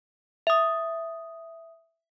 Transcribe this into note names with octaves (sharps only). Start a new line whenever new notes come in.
E5 D#6